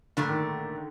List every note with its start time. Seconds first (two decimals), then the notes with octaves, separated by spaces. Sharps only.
0.17 A#2 D3 A3 D4
0.29 D#3